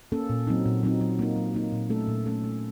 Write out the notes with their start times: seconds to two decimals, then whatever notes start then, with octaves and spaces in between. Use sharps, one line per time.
0.12 A#3 C#4 A4
0.29 A#2
0.47 F#3 C4 D#4
0.66 A#2
0.83 F#3 C4 D#4
1.01 F#3
1.19 A#3 D#4
1.36 F#3
1.54 A#3 D#4
1.72 A#2
1.90 A3 C#4 A4
2.08 A#2
2.26 A3 C#4 A4
2.44 A3